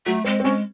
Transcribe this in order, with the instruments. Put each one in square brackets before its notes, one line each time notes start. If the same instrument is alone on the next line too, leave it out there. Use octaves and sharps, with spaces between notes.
[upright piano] F#3 [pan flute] A3
[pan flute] G#3 [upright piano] C4
[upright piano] C4
[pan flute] G#3 [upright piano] C#4